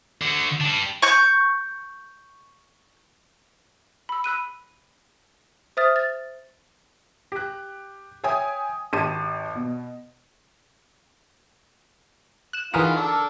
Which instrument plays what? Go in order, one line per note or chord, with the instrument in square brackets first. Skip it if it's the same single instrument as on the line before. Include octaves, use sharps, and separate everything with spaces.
[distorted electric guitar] D3 F#4
G3 D4
[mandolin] C#6 G6
[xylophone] B5 E6
B5 E6 F#6 D#7
C5 E5 D#6 F6 A6
A6
[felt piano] G4 F#6
C#5 E5 G5 G#5 D#6
G#1 G4 A5 D#7
B2
[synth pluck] F#6 E7
[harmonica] D#3 F4 [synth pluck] E3 G#4 D#6 [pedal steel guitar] F#4 A#4 B4
[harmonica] D4 A4 E6 [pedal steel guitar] A#4